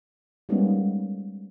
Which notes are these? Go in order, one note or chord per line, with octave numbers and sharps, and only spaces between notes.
G3 G#3 A#3 B3 C#4 D#4